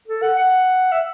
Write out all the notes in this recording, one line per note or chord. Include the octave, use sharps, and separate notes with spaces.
A4
F#5
F#5
E5